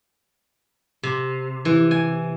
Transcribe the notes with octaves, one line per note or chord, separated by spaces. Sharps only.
C3
E3
G#5